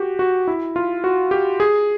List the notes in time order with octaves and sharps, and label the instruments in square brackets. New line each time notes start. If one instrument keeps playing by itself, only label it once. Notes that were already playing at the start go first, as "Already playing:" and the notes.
Already playing: [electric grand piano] F#4 G4
F#4
E4
F4
F#4
G4
G#4